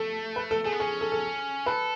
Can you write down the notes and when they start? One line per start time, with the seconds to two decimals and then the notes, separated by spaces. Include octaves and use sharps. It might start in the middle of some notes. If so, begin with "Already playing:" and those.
Already playing: A3 A4
0.36 B4
0.51 A4
0.64 A3 G#4
0.72 B3
0.80 C#4 G#4
1.01 A4
1.12 A4
1.66 A4 B4